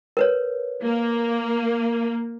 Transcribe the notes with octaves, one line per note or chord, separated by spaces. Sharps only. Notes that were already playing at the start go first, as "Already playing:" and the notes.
A#4 B4 C#5
A#3